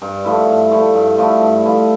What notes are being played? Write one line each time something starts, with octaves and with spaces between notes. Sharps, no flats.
G2
F3 A3 E4
G2
F3 A3 E4
G2
F3 A3 E4
G2
F3 A3 E4